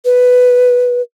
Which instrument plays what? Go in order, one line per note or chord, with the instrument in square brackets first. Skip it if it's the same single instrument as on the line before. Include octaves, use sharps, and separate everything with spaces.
[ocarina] B4